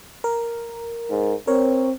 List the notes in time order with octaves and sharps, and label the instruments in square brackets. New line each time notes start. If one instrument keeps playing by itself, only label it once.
[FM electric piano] A#4
[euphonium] G#2
[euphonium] C4 [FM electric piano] A#4 C#5